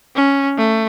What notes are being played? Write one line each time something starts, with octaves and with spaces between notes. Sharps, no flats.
C#4
A3